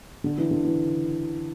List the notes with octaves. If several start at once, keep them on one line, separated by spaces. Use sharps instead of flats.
D3
E3
D3
E3